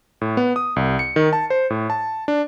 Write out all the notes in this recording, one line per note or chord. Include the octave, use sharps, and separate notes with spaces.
A2
B3
D#6
C2
C#7
D#3
A5
C5
A2
A5
D4